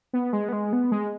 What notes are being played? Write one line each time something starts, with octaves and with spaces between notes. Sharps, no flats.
B3
G#3
B3
G#3
B3
G#3